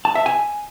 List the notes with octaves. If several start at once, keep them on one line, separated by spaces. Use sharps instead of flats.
A5
E5
G#5